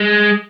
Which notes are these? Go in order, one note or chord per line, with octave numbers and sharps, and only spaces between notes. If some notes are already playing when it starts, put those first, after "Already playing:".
Already playing: G#3